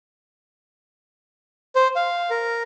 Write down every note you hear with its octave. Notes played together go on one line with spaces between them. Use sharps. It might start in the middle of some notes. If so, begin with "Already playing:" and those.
C5
F5
A#4